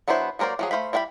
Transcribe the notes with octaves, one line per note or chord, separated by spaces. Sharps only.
F#3 B3 D4 E4 C5
F#3 A#3 A#4 C5 D5
F3 F#3 G#4
A3 C5 F5 B5
G3 E4 F5 G5 B5